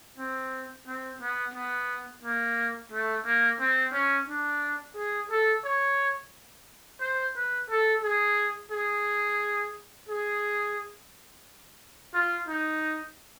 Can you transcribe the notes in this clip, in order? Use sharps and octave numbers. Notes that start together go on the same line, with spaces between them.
C4
C4
B3
B3
A#3
A3
A#3
C4
C#4
D4
G#4
A4
C#5
C5
B4
A4
G#4
G#4
G#4
F4
D#4